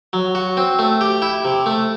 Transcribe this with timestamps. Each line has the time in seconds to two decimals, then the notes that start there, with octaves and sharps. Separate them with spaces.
0.13 F#3
0.35 F#4
0.57 C4
0.79 A3
1.01 G4
1.22 E4
1.45 C3
1.66 A3